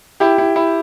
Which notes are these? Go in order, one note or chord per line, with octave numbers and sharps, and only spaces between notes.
E4 G4
E4
E4